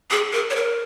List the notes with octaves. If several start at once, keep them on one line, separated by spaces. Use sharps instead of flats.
G#4
A#4
C#5
A#4